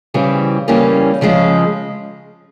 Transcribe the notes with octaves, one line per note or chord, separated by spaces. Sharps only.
C#3 E3 G3 C4
C#3 E3 G3 A#3 C#4
C#3 F3 G#3 C#4